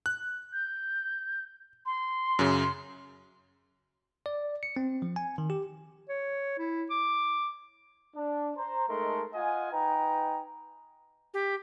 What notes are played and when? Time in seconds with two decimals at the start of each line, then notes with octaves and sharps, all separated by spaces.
0.06 F#6
0.53 G6
1.86 C6
2.39 F#2 C#3
4.26 D5
4.63 C#7
4.76 C4
5.02 F3
5.16 G#5
5.38 D#3
5.50 G4
6.09 C#5
6.58 E4
6.90 D6
8.15 D4
8.56 C5 A#5
8.88 G#3 A3 D#4 A4 A#4 C6
9.34 F4 D#5 F#5 G#5
9.72 D#4 B4 G5 G#5 A#5
11.34 G4